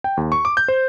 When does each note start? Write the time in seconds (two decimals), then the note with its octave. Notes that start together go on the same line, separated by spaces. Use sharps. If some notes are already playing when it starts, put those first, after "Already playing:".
0.04 G5
0.17 D#2
0.32 C#6
0.45 D6
0.57 G6
0.68 C5